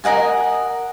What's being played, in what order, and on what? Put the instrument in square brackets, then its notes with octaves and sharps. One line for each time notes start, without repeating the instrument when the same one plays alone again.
[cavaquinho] A#4 D#5 F#5 G#5